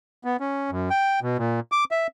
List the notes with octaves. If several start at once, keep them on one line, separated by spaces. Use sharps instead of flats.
B3
C#4
F#2
G5
B2
A#2
D6
E5